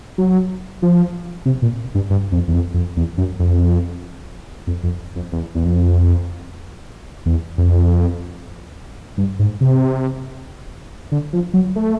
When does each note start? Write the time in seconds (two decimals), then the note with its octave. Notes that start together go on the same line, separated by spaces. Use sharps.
0.18 F#3
0.82 F3
1.46 C3
1.62 A#2
1.95 G2
2.10 G2
2.32 F2
2.48 E2
2.54 F2
2.74 F2
2.97 E2
3.18 F#2
3.39 F2
4.67 F2
4.84 F2
5.16 F2
5.32 E2
5.55 E2
5.65 F2
7.26 E2
7.58 F2
9.18 G2
9.39 G#2
9.61 C3
11.12 D3
11.33 F3
11.54 F#3
11.76 A3